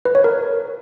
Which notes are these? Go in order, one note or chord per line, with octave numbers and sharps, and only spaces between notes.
B4
C#5
A#4